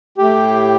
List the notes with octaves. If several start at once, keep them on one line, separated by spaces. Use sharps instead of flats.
A2 G4